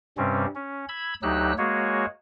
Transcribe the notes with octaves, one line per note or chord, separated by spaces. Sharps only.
G2 C3 G3 C4 C#4
C#4
B5 E6 G#6
D2 F#3 D#4 G4 E6 F#6
G#3 A#3 F#4 G#4 C#5